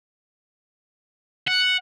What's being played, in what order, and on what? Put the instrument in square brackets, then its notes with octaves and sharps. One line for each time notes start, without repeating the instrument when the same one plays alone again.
[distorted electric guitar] F#5